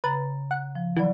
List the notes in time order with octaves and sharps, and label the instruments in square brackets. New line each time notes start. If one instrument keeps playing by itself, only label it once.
[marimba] C#3 A#5 A6 [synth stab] B4
[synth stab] F#5
[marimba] F3
[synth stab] E3 [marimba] F#3 D5